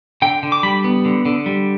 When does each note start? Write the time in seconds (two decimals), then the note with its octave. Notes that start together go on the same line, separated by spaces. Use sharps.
0.22 D3 G5
0.43 D3
0.52 D6
0.63 G3 B5
0.84 B3
1.05 D3
1.25 D3
1.46 G3